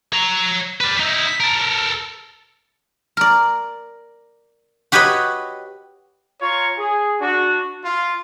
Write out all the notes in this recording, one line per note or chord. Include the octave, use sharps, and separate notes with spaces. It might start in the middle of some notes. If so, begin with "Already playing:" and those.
C#5 A#5
B4 D5
D#4 E4
A4 A#4
A#4 D5
F#4 G4 B4 C#5 D#5 B5
F4 C#5 A#5 C#6
G#4
D4 F#4
F4